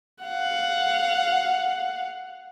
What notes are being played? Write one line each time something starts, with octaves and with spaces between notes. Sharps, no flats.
F5 F#5